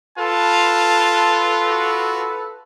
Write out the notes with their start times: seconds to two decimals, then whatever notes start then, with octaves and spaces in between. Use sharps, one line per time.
0.18 F4 A4 B4 A5
1.68 F#4